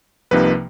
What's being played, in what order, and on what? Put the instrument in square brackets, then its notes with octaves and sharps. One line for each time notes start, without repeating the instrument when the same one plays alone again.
[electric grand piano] C2 C3 F3 A#3 D#4 B4